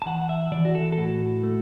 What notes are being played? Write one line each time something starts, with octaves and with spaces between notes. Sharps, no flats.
A5
E3 F#5
F#5
E5
E3 D5
F#4
A4
A4
A2 F#4
A3